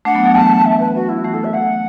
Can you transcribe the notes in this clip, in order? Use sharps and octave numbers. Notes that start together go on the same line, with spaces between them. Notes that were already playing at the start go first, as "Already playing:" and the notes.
A3 D4 F#5
F#3 B3
F#3 B3
E3 A3 A5
E3
E5
B4
F#4
E4
E3 A3 F#4
A4
E5
E3 A3 F#5